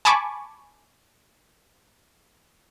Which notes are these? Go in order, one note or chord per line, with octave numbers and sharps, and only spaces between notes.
G#5 A5 B5 C#6 D6